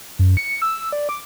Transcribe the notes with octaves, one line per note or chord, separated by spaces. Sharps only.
F#2
C#7
E6
D5
D6